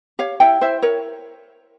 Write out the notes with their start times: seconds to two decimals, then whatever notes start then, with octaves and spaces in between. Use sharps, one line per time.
0.19 G4 C#5 F5
0.40 E4 E5 G5
0.61 E4 C5 E5
0.82 A#4 C#5